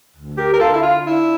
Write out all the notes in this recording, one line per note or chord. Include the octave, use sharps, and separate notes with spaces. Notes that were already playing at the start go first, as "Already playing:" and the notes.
D2
G4 A#4
A#4
D3 F4 A4
E4
F4
D4 E4